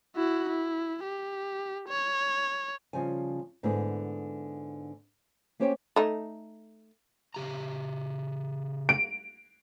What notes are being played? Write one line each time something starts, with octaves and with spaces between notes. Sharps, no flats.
E4 F#4
E4
G4
C#5
C#3 F3 G3 G#5
G#2 D3 B3 E4 G#4
A#3 C#4 G4 C5 C#5 G5
A3 D#4
C#3 G4 A#5
D7